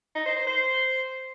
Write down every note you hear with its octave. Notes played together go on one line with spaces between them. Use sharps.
D#4
C5
C5
C5